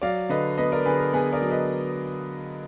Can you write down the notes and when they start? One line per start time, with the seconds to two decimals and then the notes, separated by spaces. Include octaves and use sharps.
0.02 F#3 D5 F5
0.29 D3 B4 D#5
0.58 B3 B4 D#5
0.72 A#4 D5
0.85 D3 G#4 B4
0.99 A#4
1.13 B3 G#4 B4
1.33 A#4 D5
1.42 F#3
1.51 B4 D#5